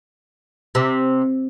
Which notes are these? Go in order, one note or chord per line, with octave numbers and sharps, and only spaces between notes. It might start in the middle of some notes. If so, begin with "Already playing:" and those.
C3